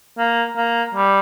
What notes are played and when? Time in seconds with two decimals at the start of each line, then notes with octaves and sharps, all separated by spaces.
0.18 A#3
0.56 A#3
0.94 G3